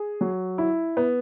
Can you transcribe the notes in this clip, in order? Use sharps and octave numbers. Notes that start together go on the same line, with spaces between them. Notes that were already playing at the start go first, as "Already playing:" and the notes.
Already playing: G#4
F#3
E4
B3